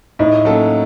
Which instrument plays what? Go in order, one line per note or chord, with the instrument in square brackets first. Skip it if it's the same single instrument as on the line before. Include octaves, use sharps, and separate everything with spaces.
[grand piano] A2 [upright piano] D#4
[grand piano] F#3 A#3 C#4 A4